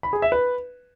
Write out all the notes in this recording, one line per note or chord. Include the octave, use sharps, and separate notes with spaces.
B5
G#4
E5
B4